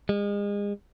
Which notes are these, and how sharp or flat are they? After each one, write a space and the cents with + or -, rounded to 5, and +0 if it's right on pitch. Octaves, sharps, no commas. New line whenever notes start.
G#3 -35